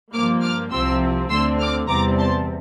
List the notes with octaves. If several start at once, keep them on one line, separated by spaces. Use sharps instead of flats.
G2 F3 A#3 D6 F6
D6 F6
C2 C3 F3 C4 C6 E6
D2 D3 A3 C4 C6 E6
D6 F6
E2 C3 G3 C4 A#5 D6
A5 C6